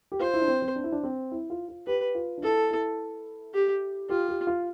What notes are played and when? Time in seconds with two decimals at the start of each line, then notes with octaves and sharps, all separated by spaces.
0.12 G4
0.20 F4 C5
0.34 E4
0.42 D4
0.48 C4
0.62 C4
0.76 D4
0.84 E4
0.92 D4
1.03 C4
1.32 E4
1.50 F4
1.68 F4
1.87 G4 B4
2.15 F4
2.38 D4
2.43 E4 A4
2.71 E4
3.54 G4
4.10 F4 G4
4.29 G4
4.47 F4